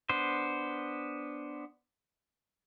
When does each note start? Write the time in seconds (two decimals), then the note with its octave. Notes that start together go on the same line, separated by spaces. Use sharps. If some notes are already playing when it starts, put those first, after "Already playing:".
0.09 B3 D4 C5